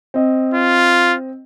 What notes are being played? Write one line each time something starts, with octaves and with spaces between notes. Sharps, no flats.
C4 D#5
F4